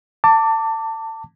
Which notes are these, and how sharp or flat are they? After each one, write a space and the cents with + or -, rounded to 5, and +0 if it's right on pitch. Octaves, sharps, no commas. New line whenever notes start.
A5 +25 D6 -10